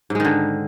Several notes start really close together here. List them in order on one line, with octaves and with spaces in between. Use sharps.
G#2 G#3 D#3 D3